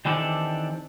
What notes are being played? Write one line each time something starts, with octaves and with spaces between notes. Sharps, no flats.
D#3 E3 C4 D4 G4 A4